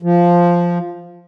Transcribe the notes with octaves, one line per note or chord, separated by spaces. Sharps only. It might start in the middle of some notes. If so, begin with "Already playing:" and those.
F3